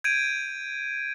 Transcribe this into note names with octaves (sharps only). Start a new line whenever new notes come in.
G6 G#6 D7 D#7